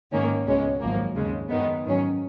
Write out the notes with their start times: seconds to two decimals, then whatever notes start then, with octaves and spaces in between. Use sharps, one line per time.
0.12 G#2 D#3 A#3 C#4
0.46 C#2 B2 G#3 C#4
0.81 G#1 F#2 F3 A#3
1.15 D#2 C#3 G#3
1.49 F#2 D#3 G#3 B3 D#4
1.84 G#2 D#3 F#3 C#4